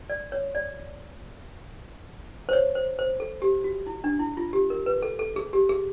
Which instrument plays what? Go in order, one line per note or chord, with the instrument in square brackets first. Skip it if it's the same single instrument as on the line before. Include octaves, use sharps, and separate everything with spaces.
[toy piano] D5
C#5
D5
C5
C#5
C5
C5
A4
G4
F#4
E4
D4
E4
F4
G4
A#4
B4
A4
A4
G#4
G4
G#4